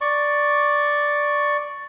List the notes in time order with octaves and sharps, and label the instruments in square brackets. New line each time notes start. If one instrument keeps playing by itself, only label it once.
[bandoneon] D5 C#6